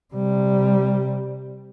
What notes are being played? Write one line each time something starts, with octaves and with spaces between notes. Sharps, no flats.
C3 G3